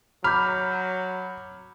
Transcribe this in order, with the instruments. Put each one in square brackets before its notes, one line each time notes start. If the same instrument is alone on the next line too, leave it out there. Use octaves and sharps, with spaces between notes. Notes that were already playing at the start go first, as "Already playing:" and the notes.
[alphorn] F#3 [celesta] A#5 D6 G6 [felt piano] B5 [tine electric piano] F6